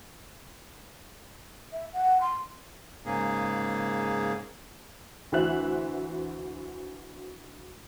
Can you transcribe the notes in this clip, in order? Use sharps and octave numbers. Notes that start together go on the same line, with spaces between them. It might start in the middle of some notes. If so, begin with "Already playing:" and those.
E5
F#5
C6
G#2 C#3 A#3 G#4
D2 E3 F#4 C5 E5 F#6